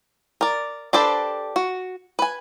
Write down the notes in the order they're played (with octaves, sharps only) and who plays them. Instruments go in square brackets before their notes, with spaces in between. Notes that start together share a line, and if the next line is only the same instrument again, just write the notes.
[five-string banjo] A#4 D5
D4 G4 A4 B4 C5
F#4
B4 G#5